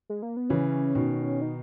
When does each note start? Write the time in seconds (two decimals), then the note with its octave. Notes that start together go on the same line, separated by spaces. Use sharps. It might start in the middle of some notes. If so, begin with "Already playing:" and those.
0.09 G#3
0.22 A#3
0.37 B3
0.49 C#3 E3 C#4
0.95 B2 D#3
1.42 D#4